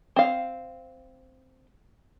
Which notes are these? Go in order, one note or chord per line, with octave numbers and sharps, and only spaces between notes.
C4 F5